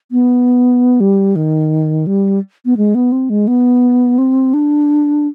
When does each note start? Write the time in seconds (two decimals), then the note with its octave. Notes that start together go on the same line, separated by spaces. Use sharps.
0.11 B3
1.00 G3
1.36 D#3
2.07 G3
2.65 B3
2.77 G#3
2.95 B3
3.12 C4
3.30 G#3
3.47 B3
4.18 C4
4.54 D4